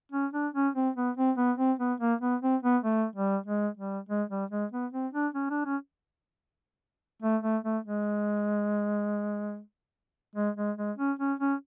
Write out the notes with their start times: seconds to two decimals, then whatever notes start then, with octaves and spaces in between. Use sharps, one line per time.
0.12 C#4
0.33 D4
0.54 C#4
0.75 C4
0.96 B3
1.17 C4
1.37 B3
1.58 C4
1.79 B3
2.00 A#3
2.21 B3
2.42 C4
2.63 B3
2.83 A3
3.15 G3
3.46 G#3
3.77 G3
4.09 G#3
4.30 G3
4.51 G#3
4.72 B3
4.93 C4
5.13 D4
5.34 C#4
5.50 D4
5.65 C#4
7.22 A3
7.43 A3
7.64 A3
7.85 G#3
10.35 G#3
10.57 G#3
10.77 G#3
10.98 C#4
11.19 C#4
11.40 C#4